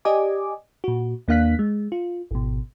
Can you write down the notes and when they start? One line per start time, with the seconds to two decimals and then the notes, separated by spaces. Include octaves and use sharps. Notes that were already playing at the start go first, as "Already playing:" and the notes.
0.05 G4 D5 D#5 G#5 D6
0.84 A#2 F#4
1.28 D#2 A#3 D4 F5 F#6 B6
1.59 G#3
1.92 F4
2.31 G#1 B2